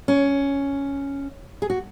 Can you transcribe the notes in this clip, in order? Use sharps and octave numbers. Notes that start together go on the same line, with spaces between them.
C#4
G#4
F#4